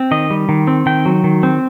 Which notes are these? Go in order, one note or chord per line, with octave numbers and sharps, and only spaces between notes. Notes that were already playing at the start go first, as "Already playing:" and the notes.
Already playing: C4
D#3 D#5
G3
D#3
C4
D#3 G5
F#3
D#3
C4